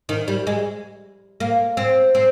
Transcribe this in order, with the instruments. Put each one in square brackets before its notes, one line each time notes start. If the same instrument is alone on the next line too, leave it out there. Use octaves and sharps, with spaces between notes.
[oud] D#3
G3
G#3
A#3
C4
C4